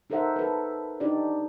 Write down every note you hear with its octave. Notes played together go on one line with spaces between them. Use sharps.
D#4 A4 A#4 C5 E5 F#5
A4 B4
D4 D#4 G4 D5